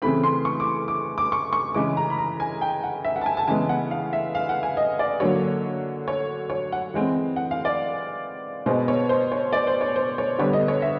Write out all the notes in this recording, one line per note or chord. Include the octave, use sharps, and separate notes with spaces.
C#3 E3 A3 C4 B5
C6
C#6
D6
D6
D6
C#6
C#6
C#3 E3 G#3 D6
A#5
B5
A#5
G#5
G5
F#5
E5
F#5
A5
G#5
A5
C#3 E3 G#3 B3 G#5
F#5
F5
E5
F5
F#5
G#5
D#5
D5
D3 F#3 A#3 C#5
C#5
C#5
F#5
E3 G#3 C4
F#5
F5
D5
B2 G#3 B3 C5
C#5
C5
C#5
D5
C5
C#5
C5
C#5
D3 G3 B3 C#5
D#5
C#5
E5